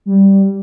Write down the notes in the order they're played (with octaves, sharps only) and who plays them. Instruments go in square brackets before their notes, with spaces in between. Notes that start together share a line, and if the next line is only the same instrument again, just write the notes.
[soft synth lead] G3